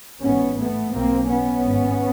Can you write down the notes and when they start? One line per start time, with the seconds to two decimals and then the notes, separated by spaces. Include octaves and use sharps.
0.22 A1 G#2 B3 C#4
0.57 A3 B3
0.93 B1 B2 A#3 C4
1.28 B3 C#4
1.63 G#1 G#2